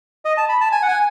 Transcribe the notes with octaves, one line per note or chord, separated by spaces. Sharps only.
D#5
A5
B5
A5
G#5
F#5
G#5